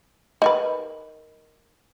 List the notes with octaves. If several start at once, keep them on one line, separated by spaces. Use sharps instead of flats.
D#4 A#4 B4